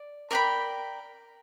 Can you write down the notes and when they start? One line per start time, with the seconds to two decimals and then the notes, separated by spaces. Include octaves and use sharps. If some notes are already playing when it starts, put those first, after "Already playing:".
Already playing: D5
0.31 A#4 D5 G5 B5